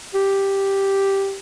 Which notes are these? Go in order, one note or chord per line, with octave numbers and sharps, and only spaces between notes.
G4